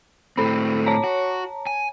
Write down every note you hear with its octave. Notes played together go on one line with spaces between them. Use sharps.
A2 C4 A4 B5
C#5 A5 A#5
F#4
G#5